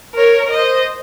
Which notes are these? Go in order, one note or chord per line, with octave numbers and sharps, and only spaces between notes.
A#4 C#5
C5 D#5